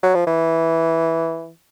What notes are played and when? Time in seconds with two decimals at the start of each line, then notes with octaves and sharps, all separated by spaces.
0.03 F#3
0.15 F3
0.27 E3